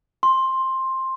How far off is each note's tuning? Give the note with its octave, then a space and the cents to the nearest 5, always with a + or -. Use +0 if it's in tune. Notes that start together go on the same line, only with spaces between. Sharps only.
C6 +10